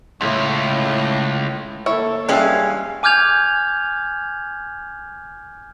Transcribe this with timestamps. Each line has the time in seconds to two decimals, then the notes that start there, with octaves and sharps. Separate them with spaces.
0.21 C#2 A2
1.86 A#3 E4 A4 C#5
2.29 G2 E3 G#3 C#4 G#4 E5 F5
3.03 G#5 D6 F6 G6 G#6 F7